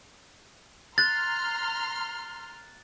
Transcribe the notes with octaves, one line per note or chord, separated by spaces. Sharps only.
A#5 C6 F6 F#6 A6